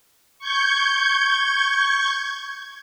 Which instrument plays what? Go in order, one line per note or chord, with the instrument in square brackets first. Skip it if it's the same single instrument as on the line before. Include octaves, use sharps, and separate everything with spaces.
[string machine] C#6 G6 G#6